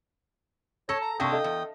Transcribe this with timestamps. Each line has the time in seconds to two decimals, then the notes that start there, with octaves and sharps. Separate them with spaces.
0.89 A4 C#5 A5 A#6
1.02 A#5
1.20 C3 A#3 D4 G5 C6 C#6 D#6 A#6
1.32 A4 D#5 F5
1.44 E2